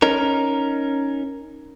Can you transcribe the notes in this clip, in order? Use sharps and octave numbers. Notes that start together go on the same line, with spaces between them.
C#4 D#4 A#4